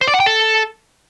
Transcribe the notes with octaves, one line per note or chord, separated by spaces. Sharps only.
C5
D5
F#5
G5
A4